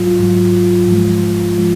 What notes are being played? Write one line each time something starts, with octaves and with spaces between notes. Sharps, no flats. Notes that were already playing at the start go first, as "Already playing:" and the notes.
Already playing: G#2 F#3 F4
G#2 F#3
G#2 F3 G#3
F3 G#3